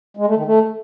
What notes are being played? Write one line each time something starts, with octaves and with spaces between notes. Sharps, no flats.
G#3
A3
D#3
A3